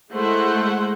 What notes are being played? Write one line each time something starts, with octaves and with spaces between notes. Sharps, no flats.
G#3 A3 E4 C5 F#5